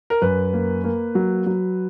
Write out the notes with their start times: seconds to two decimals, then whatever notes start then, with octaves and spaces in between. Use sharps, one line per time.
0.10 A#4
0.22 F#2 B4
0.53 A#3
0.84 A#3
1.15 F#3
1.46 F#3